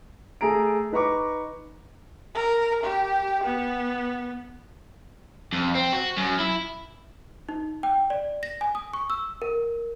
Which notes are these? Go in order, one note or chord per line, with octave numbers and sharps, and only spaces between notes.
A3 G#4 A#5 D7
D#4 B4 A#5 C#6 D6
A#4
G4
B3
F2
C4
F#4
F#2
E4
D#4
G5
D5
A#6
G#5
D#6
C#6
E6
A#4